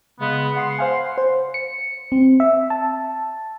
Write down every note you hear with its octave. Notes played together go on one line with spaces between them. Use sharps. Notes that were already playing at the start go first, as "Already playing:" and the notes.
C#3 G#3 B3
F#5 C6
C5 F5 G#5
C5
C#7
C4
E5
A5